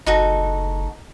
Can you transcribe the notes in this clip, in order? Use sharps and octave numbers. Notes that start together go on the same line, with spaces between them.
F#1 D#4 F#4 A4